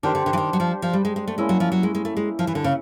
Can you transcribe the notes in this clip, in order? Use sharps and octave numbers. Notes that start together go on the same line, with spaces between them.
D#3 D4 G4 C5
D3
D3
E3
D#3
F#3
F3
F3
G3
G#3
G#3
A3
G#3 A#3 C#4 E4
F#3
F3
F#3
G#3
G#3
A3
G#3
F3
E3
D3
C#3